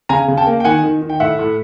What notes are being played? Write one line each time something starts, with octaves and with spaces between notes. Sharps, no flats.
C#3 G#5 A#5
C#3
G5 A5
A#3
G5
D#3 F#5 G#5
D#3
D#3
G5
A2 E5 F#5
A2